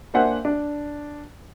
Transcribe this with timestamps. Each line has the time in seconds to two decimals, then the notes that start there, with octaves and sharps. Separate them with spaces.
0.14 A#3 D4 C5 E5 F#5 G#5
0.45 D4